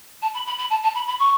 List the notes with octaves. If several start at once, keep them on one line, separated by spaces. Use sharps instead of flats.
A5
B5
B5
B5
A5
A5
B5
B5
C#6